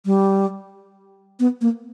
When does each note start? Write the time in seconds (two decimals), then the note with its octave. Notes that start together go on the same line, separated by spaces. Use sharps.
0.06 G3
1.40 B3
1.61 A#3